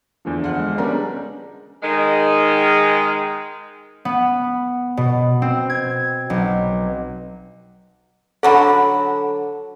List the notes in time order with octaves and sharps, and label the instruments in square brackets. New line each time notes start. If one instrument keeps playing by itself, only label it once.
[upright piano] E2 D3 F3
[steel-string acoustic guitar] F4 F#5
[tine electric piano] G#3
[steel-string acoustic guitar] G3 G#3 B3 [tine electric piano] C#4 D4 [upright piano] A#4 D5 A#5
[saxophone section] D#3 G#3
[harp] B3
B2
C4
G#6
B1
[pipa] D3 F#3 F#5 [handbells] A4 B5